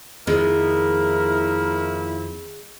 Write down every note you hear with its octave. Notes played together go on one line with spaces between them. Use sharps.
F2 D#3 F3 G#3 A#3 C4 E4 A#4